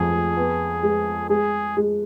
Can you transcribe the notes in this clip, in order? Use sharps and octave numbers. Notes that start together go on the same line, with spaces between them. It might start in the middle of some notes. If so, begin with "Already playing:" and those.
Already playing: F2 G#4
B3
G#3
G#3 G#4
G#3